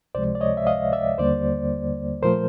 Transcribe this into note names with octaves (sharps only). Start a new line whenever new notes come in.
C#2 C3 F3 G#3 C5 D5
D5
C#5 D#5
E5
D#5 F5
D5 E5
D#2 D3 G3 A#3 C5 D5
A#2 F3 A3 A#4 C5